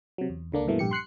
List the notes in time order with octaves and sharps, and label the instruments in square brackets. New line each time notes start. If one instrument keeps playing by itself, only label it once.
[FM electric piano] C3 F#3
E2
C#2 D3 A#3 D4
G2 B2 E3 A3 A#3
A#1 G2 G4 C#7
C6 F#6 C7 C#7